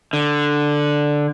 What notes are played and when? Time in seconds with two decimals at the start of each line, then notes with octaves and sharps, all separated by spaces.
0.13 D3